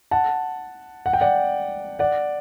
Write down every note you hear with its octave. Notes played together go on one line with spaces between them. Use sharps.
F#5 A5
F#5
G5
D5 F#5
D5 F#5